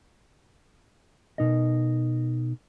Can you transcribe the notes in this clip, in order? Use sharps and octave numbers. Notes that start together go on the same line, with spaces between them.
B2 D#4 A#4 D#5